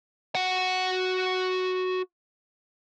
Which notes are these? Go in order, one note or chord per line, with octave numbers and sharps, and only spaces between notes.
F#4 F#5